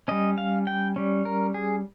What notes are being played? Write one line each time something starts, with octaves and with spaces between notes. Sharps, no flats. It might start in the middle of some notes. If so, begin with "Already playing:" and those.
G3 C#4 D#5
F5
G5
G3 C#4
A#4
G#4